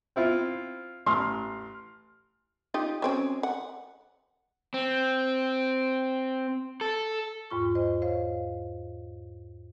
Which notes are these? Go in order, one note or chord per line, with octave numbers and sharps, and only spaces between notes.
C4 E4 F4
A1 C6 F6
D#4 F4 G4
F#3 C4 C#4
F#5
C4
A4
E2 G#2 F4 C#6
C5 D#5
C5 C#5 F5